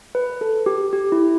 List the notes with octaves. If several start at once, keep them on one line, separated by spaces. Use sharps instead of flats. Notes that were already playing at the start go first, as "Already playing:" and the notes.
B4
A4
G4
G4
E4